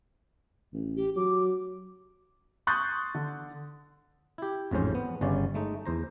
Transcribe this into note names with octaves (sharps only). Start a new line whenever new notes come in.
A1
G4
F#3 D6
C6 C#6 D#6 F#6 G6 A6
D3
E4 G4
A1 F2 G#2 C#4 C5
B3
G1 G2 C#3 C#4 D5
G#3 A3 D#4
E2 C5 A#5